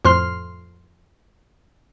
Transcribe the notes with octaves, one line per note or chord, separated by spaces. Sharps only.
F2 A2 C5 C6 F6